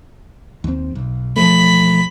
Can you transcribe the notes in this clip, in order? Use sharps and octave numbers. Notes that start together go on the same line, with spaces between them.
D#2 C4
B1
E1 F3 A3 B5